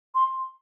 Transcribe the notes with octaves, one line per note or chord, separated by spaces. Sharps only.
C6